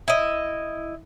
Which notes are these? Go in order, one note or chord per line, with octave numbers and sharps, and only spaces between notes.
E4 D#5